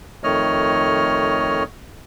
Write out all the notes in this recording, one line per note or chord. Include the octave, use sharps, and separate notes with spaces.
F2 D#3 A3 C#5 D#5 F6